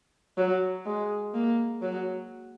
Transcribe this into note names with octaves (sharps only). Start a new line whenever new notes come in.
F#3
G#3
A#3
F#3